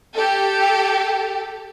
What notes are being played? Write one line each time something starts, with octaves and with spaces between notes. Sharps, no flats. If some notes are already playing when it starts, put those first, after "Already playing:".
G4 A4